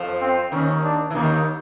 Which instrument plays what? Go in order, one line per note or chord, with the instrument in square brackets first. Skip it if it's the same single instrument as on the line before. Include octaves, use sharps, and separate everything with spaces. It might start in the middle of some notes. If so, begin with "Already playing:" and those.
Already playing: [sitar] F2 F3
[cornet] C4
[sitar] D#2 D#3 [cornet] C#4
[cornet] D4
[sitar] E3
[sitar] D#2 D#3 [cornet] A#3